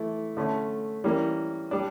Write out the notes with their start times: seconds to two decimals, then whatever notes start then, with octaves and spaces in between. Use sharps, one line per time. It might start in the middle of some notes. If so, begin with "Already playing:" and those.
Already playing: E3 A3 E4
0.37 D3 A3 C#4
1.04 E3 G3 A#3 C#4
1.71 G3 D4